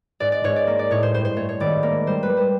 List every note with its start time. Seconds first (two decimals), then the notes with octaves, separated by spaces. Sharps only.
0.20 G#2 D5
0.32 D5
0.44 G#2 C#5
0.56 D5
0.67 A#3
0.79 D5
0.91 A2 C#5
1.03 C5
1.14 G2 C5
1.25 C5
1.36 A3 C#5
1.49 C#5
1.60 G#1 D5
1.83 A#3
2.06 G3 C5
2.23 B4
2.29 G3
2.37 C5